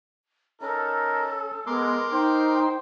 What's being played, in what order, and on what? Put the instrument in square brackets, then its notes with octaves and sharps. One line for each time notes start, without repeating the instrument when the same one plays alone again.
[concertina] C#4 [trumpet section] D#4 A#4 [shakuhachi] A4
[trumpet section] G#3 [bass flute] B3 [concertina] A#4 C6 D6
[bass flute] D#4 [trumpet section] C5 [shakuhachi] G5